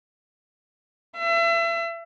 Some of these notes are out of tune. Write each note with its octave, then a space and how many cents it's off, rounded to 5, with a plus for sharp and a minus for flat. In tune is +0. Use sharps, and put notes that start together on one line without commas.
E5 +35